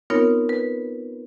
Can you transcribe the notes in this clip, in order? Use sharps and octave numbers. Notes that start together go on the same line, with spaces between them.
B3 C4 D#4 F4 A#4 C#5
B4